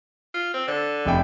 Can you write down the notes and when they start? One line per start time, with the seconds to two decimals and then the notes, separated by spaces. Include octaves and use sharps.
0.34 F4
0.54 C4
0.68 D3
1.05 F1 E4 G5